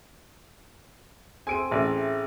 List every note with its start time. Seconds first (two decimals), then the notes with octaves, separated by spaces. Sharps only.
1.47 C4 G#4 A4 G#5 D7 D#7
1.71 A1 E5